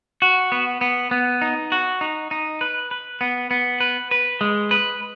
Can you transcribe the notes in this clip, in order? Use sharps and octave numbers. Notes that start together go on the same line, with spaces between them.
F#4
B3
B3
B3
D#4
F#4
D#4
D#4
B4
B4
B3
B3
B4
B4
G#3
B4